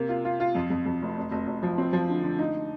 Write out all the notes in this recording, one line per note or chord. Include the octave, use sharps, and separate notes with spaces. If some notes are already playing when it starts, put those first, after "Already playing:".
Already playing: C3 A#3
F4
F4
F4
F2
F2
F2
F1
F1
F1
F1
F3
C4
F3
D3
D3
D#4